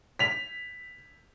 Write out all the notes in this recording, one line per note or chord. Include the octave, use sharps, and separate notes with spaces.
B6 F7